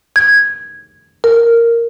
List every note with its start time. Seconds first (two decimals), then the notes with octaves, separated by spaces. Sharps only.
0.16 G#6
1.24 A#4